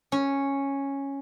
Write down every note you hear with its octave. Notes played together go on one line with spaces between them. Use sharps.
C#4